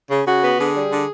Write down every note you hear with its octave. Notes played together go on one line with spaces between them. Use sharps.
C#3
C#3 F#4
B3
D3 G#4
G3
D3